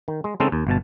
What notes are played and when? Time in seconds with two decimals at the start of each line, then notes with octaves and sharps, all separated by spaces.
0.08 D#3
0.24 G#3
0.40 C#3 G#3 C4 C#4 D#4 A4
0.52 D#2
0.67 G1 B2 A5